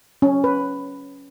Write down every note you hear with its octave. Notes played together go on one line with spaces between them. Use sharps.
C#4
B4